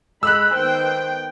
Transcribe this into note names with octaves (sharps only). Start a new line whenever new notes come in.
G#3 B5 E6 F#6
D#3 B3 C5 G5